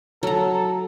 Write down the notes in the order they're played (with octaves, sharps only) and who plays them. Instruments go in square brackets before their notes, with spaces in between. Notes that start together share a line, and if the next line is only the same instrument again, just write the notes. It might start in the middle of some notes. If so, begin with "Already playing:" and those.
[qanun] F#3 A#5 [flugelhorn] A4